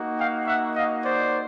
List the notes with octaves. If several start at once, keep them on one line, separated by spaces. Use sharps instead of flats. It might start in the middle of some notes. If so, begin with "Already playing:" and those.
Already playing: A#3 D#4 F#4
F5 G5
E5 F#5
D#5 F5
C5 D5